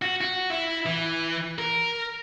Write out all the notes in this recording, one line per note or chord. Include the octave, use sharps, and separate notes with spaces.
F#4
F#4
E4
E3
A#4